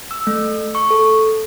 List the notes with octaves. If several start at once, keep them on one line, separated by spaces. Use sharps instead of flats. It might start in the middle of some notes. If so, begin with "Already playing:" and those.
E6
A3
C#6
A4